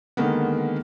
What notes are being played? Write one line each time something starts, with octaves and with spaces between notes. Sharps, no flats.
D3 D#3 G#3 A#3 B3